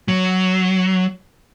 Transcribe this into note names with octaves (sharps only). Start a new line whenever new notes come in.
F#3